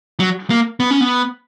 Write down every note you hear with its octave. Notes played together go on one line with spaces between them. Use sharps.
F#3
A#3
B3
C#4
B3